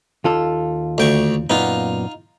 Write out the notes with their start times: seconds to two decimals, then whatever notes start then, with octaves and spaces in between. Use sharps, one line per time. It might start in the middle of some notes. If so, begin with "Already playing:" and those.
0.24 D#2 F4 A4
0.98 D2 G5 C#6
1.50 F#2 A#2 B3 D#4 F4